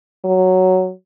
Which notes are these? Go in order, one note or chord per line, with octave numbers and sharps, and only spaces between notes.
F#3